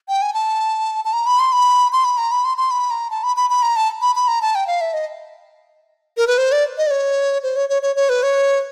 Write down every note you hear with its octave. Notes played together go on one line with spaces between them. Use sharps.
G5
G#5
A5
A5
A#5
B5
C6
B5
C6
B5
A#5
B5
C6
C6
B5
A#5
A5
B5
B5
B5
A#5
A5
B5
B5
A#5
A5
G5
F5
E5
D#5
A#4
B4
C5
D5
D#5
D5
C#5
C5
C#5
C#5
C#5
C#5
B4
C#5